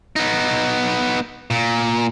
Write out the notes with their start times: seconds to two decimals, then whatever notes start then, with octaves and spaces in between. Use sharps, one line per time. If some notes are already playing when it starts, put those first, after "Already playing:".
0.16 B3 D#4
1.50 A#2